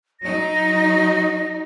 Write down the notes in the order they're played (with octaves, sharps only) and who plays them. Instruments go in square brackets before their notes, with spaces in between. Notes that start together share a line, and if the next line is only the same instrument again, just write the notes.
[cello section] F#3 D#4 [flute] A#6